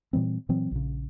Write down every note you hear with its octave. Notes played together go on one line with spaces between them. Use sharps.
A#2 E3 G3 C4
A#2 E3 F#3 C4
A#1 C#3